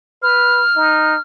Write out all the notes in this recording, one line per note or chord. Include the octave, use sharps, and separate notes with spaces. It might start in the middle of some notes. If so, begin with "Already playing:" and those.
B4 F6
D#4